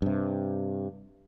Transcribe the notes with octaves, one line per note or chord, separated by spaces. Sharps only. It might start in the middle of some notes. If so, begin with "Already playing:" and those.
G2 C3